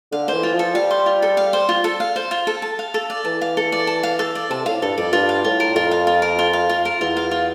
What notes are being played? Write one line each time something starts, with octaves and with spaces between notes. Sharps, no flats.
D3 F5
E3 C5
F4
F3 A4
G3 F5
C5
F4
A4
F5
C5
F4
A4
F5
C5
F4
A4
A5
F5
A4
D5
E3 A5
F5
A4
D5
A5
F5
A4
D5
C3 A5
A2 F5
G2 A4
F2 D5
G2 F4
F5
A2 F4
A#4
F2 F4
F5
F4
A#4
F4
F5
F4
A#4
E2 F4
F5
F4